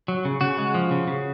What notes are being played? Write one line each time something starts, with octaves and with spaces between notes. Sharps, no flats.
F#3
C#3
C#3 F#4
G#3
F3
C#3
C#3